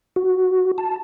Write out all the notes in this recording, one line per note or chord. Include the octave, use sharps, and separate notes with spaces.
F#4
A5